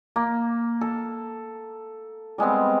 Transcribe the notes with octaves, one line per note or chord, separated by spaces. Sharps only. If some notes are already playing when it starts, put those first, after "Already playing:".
A#3
A4
G3 G#3 B3 C4